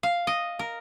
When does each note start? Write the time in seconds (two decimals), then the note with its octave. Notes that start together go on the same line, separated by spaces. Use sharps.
0.03 F5
0.27 D#5
0.59 A#4